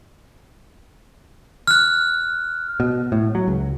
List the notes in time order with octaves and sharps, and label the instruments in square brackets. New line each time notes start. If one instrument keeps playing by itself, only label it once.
[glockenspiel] F6 F#6
[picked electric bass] B2
A2
F#3
C#2